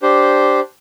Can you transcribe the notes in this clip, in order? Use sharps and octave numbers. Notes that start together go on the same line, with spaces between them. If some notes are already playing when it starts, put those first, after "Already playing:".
D4 G4 C5